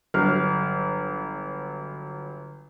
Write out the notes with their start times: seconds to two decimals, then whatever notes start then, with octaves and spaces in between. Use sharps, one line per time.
0.14 G1 F#3 F6